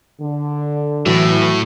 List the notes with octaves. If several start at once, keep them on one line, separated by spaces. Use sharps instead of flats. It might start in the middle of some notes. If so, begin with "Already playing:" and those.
D3
A2 E3 F#3